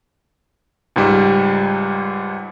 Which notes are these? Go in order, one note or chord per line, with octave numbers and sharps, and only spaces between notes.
C#2 G#2 G3